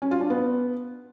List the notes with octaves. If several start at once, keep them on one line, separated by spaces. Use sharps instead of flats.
C#4
F4
D4
B3